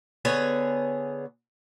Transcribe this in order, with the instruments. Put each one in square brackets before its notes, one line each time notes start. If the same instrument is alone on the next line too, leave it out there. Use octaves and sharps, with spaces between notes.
[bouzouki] D3 B3 G#4 C#5